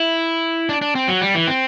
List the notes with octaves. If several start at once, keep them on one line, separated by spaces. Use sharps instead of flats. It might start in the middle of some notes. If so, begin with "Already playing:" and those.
Already playing: E4
D4
D4
C4
F#3
G3
E3
C4